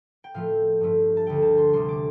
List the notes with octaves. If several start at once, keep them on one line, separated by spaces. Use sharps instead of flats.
G5
A2 F3 A3 F5
G2 F3 A3
A5
D2 D3 A3 G5
A5
C6
D2 C3 G3 C6
D6